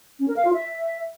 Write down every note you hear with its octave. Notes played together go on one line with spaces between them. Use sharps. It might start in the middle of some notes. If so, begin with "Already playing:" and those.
C#4
A#4
F5
F4
E5